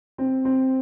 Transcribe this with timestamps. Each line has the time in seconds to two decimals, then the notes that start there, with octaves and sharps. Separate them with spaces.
0.18 C4
0.45 C4